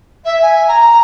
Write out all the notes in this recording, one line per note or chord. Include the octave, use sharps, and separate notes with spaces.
E5
G#5
A#5